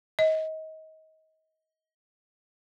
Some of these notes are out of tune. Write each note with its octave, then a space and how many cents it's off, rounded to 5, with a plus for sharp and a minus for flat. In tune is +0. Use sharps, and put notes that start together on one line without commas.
D#5 +30